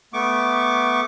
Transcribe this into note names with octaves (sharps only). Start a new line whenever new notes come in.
A3 B3 C#6 D6